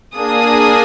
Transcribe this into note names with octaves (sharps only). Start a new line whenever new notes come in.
A#3 D4 G#4 D#6